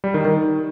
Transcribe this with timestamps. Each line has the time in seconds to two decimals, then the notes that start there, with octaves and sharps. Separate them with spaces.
0.04 G3
0.14 D#3
0.25 D#3